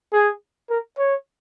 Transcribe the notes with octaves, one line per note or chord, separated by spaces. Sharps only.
G#4
A#4
C#5